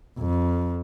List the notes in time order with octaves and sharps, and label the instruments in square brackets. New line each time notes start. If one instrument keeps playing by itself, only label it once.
[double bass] F2